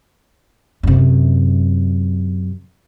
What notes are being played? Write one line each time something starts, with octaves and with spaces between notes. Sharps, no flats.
F#2 C3